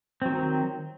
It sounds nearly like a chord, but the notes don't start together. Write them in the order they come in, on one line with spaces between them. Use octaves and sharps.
C4 F#3 D#3